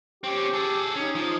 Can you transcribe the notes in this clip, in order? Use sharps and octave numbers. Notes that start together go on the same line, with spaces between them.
C4 C#4 G4
G#4 A4
C#4 D#4
F3